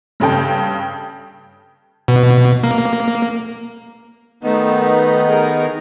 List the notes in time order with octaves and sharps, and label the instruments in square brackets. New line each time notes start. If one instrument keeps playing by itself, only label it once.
[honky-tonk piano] G2 C#3 A4 G5
[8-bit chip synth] B2
A#3
[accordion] D#3 B3 D#4 [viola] A3
[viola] G#4 A#4